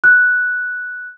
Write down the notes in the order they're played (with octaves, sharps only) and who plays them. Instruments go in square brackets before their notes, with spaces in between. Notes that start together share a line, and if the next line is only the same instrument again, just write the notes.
[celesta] F#6